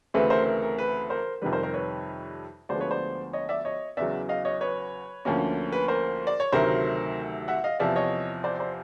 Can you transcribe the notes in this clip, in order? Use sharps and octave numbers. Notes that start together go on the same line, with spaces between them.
D2 C#3 E3 A3 C4 B4
A#4 C5
A#4
A#4
B4
A#4 C5
F2 C3 D#3 G3 B4
A#4 C5
A#4 C5
B4 C#5
D2 D3 F3 G#3 B3 C5 D5
B4 C#5
C5 D5
C#5 D#5
D5 E5
C#5 D#5
E2 C#3 F#3 D5 E5
D#5 F5
C#5 D#5
B4 C#5
D2 D3 F3 A#3 C#4
B4
A#4 C5
D5
C#5
D2 C3 D#3 F#3 A3 A#4 C5
E5 F#5
D#5 F5
E2 C3 F3 D5 E5
C#5 D#5
C5 D5
C5 D5